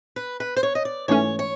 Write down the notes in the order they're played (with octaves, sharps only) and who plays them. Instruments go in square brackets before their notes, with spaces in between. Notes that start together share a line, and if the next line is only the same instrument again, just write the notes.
[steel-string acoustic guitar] B4
B4
C5
C#5
D#5
D5
[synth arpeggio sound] G#2 E3 A3 C#4 [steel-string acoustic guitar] C#5
[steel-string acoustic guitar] C#5